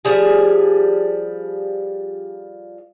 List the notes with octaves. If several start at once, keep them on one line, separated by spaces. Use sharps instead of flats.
F3 G3 G#4